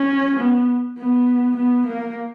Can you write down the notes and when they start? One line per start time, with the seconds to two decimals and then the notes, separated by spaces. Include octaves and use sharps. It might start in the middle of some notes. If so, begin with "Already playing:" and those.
Already playing: C#4
0.40 B3
0.99 B3
1.57 B3
1.87 A#3